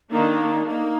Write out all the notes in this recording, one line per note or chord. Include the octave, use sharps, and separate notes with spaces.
D#3 A#3 D4 D#4
A#3 D#4